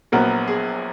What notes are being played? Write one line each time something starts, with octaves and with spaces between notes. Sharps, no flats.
A#1 A#2 F#3 B3 A#4
G#4